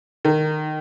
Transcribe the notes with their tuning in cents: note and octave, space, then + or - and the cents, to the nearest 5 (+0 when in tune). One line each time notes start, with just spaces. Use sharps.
D#3 -15